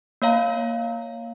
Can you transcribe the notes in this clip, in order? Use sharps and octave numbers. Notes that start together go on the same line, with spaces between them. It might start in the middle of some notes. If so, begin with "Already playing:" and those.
A#3 C#5 F5 A#5